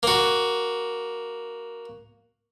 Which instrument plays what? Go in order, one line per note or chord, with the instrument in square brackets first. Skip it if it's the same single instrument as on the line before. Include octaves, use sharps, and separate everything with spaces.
[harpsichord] A#3 F#4